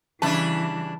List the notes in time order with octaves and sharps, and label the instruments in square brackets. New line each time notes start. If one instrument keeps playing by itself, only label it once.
[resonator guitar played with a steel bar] C#3 G3 [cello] E3 [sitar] D4 E4 B4 [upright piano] A5